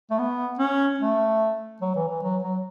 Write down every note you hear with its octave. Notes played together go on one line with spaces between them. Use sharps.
A3
B3
C#4
A3
F#3
E3
E3
F#3
F#3